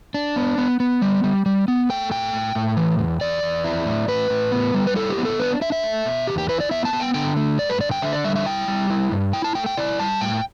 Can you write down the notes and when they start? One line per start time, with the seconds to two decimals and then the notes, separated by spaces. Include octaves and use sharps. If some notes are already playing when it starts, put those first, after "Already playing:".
0.14 D4
0.36 B3
0.58 B3
0.80 B3
1.02 G3
1.24 G3
1.46 G3
1.68 B3
1.89 A3 G5
2.11 A2 G5
2.33 A2
2.55 A2
2.77 E3
2.99 E2
3.21 E2 D5
3.43 E2
3.64 E4
3.86 A2
4.08 A2 B4
4.30 A2
4.52 B3
4.74 G3
4.87 B4
4.95 E4 A4
5.10 G4
5.18 B3
5.25 A4
5.40 D4 B4
5.61 D4 E5
5.72 E5
5.83 A3
6.05 B2
6.27 E2 G4
6.38 G4
6.49 E4 B4
6.60 D5
6.71 B3 E5
6.85 A5
6.93 B3
7.00 G5
7.14 D3 G5
7.37 A3
7.58 G2 D5
7.69 B4
7.81 D3 D5
7.91 G5
8.02 D3 E5
8.13 D5
8.24 G3 E5
8.36 E5
8.46 E4 G5
8.68 G3
8.90 E4
9.12 G2
9.33 E4 G5
9.44 A5
9.55 A3 G5
9.66 G5
9.77 E4 D5
9.99 G3 A5
10.21 A2 G5